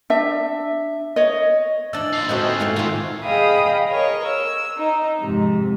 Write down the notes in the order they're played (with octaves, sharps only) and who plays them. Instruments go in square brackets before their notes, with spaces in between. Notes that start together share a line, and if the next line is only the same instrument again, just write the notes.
[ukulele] D4 E5
C#5 D#5
[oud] E3 D4 [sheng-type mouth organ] D5 [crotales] E6 A6 F#7
[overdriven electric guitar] D#4 F4 [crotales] C7
[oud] C4 F#4 A4 [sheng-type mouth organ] B4 D#5 E5
[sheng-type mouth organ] G#5 F6
[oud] G#2 A3 B3
[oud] D#3 F4 [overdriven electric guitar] C5 E5
[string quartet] G#4 D#5 F5 G5 B5 D#6
A#4 C#5 D#5
E6
D#4
F2 G#2 C3